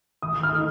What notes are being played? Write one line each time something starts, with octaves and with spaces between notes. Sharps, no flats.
D#3 D#6
F6
A3 D#4